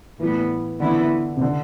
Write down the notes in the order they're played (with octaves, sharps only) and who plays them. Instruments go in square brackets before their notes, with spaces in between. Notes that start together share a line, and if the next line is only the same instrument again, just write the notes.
[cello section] A2 G3 B3 [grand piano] E3
[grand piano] D3 [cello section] E3 B3 E4
[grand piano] C3
D3